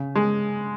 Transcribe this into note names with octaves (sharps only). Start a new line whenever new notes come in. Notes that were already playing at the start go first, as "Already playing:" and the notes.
Already playing: C#3
G#3